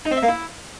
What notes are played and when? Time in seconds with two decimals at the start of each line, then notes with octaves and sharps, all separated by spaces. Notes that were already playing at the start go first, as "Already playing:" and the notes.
0.05 D#4
0.11 C4
0.17 E5
0.23 A#3
0.28 E4